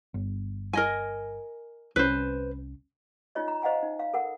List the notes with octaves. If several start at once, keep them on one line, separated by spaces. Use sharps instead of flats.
G1
A#4 D#5 G#5
C2 C#4 B4 C5
D#4 F4 C#5 D#5
A#5
C5 D#5 F5 F#5 G#5 A#5
D#4
F5
A4 A#4 F#5